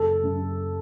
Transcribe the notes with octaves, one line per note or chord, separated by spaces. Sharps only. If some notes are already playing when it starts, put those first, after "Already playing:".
Already playing: F#1 A4
F#2